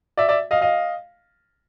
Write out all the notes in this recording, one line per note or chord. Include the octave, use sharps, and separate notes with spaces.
D5 E5
D5 E5
D#5 F5
D#5 F5